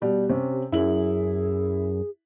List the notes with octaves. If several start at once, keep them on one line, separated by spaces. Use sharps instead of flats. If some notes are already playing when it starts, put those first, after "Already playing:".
B2 G3 G4
C3 C#4
F#2 E4 G#4 F#7